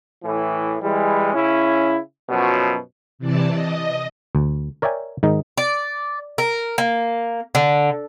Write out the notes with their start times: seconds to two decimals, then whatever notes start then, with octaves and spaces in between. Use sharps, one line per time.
0.24 A2 E3
0.82 E3 G3 G#3
1.34 C#3 C#4 E4
2.29 F#2 B2 F3 F#3
3.19 C3 E3 D5 A5
3.52 D#5
4.35 D2
4.82 A#4 C#5 D5 E5 G5 G#5
5.23 G#2 D#3 D#4
5.58 D5
6.38 A#4
6.78 A#3
7.55 D3